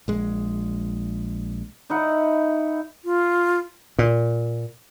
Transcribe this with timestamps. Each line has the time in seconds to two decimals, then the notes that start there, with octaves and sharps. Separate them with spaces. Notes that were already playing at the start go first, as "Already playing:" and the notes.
0.08 A#1 G#3
1.90 D#4 E4 F#5
3.05 F4
3.99 A#2